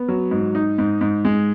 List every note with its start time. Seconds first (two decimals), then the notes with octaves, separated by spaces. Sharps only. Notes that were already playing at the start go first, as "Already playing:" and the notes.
Already playing: B3
0.08 F#3
0.31 G#2
0.55 D#4
0.78 G#2
1.01 G#2
1.25 G#3